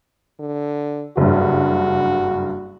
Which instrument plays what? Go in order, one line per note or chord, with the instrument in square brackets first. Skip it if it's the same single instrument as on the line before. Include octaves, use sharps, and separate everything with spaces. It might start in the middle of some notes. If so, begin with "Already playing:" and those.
[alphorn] D3
[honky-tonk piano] F#1 G2 [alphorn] F#4